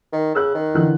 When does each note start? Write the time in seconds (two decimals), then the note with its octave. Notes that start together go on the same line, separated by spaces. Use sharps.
0.13 D#3
0.35 C#3 E6 F#6
0.55 D#3
0.75 D3 E3 F#6